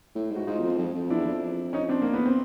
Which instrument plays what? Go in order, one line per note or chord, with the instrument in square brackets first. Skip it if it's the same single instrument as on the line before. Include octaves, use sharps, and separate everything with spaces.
[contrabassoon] A2
[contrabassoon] G#2 [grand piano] F#4
[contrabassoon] G#2 [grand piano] D#4 F4
[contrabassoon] E2
F2
F2
F2
[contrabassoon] E2 [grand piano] D4 E4
[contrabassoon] F2
[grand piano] C#4 D#4
C4 D4
A#3
[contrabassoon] E2 [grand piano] B3
[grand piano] C4